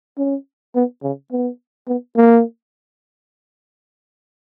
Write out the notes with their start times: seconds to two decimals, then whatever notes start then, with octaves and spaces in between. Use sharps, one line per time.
0.18 C#4
0.75 B3
1.03 C#3
1.32 B3
1.88 B3
2.16 A#3